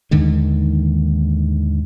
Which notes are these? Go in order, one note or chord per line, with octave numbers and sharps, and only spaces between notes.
D#2 G#2 D3 D#3